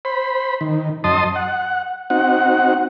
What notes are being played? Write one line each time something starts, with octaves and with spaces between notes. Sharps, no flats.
C5 B5
D#3
F#2 D#5 A5 C6 D#6
F#5
C4 D#4 F#4 F#5